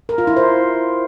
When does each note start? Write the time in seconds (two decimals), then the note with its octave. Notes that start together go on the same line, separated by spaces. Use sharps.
0.09 A#4
0.18 F4
0.27 E4
0.37 C5